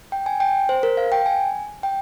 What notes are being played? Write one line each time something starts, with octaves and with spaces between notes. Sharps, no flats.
G5
G#5
G5
C5
A#4
F5
G5
G#5
G5